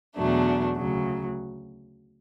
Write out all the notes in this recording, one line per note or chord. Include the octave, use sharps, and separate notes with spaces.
E2 B2 F#3 A3 D4
D2 C#3 F#3